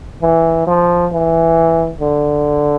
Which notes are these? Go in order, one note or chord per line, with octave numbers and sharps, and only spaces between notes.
E3
F3
E3
D3